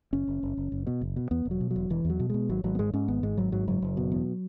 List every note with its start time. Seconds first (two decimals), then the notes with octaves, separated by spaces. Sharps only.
0.13 F#1 C#4
0.28 F#1
0.43 F#1
0.57 F#1
0.72 F#1
0.87 B2
1.01 F#1
1.16 B2
1.31 E2 B3
1.45 E1
1.51 F#3
1.61 B2
1.71 F#3
1.76 E1
1.90 E1 E3
2.05 E2
2.10 F#3
2.20 B2
2.30 B2 G#3
2.49 G#1 F#3
2.64 G#1 F#3
2.75 B3
2.79 G#2 G#3
2.94 G#2 C#4
3.08 G#1 B3
3.23 G#2 G#3
3.38 G#1 F#3
3.52 G#2 F#3
3.67 F#1 F#3
3.82 F#1
3.97 B2
4.12 E2